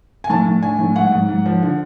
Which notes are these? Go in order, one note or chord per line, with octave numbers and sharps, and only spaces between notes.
G#5
A2 A5
A2
D4 G#5
A2
G#2 F#5
G#2
G#2
F3
D3